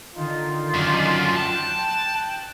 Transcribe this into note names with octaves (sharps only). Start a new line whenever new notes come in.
D3 D#3 D#4 F4
F#2 D4
G5 A5 F#6